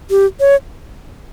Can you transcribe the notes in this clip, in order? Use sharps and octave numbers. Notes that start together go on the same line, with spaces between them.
G4
C#5